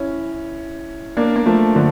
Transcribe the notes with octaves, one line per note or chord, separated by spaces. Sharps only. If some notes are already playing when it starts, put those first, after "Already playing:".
Already playing: C#4 E4
A#3 D4
A#3
F3 A3
D3 F3